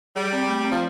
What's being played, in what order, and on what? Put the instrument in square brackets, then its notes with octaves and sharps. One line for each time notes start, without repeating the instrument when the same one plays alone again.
[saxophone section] G3 [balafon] G#4
[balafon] C4
A3
C4
[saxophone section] F3